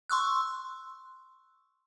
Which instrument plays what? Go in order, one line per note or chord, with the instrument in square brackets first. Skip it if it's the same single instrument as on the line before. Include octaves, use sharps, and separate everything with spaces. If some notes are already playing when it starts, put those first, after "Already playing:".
[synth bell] C6 C#6 E6 F#6